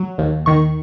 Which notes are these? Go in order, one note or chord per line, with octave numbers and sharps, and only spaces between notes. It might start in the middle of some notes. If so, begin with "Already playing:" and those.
Already playing: F#3
D#2
D#3 C#6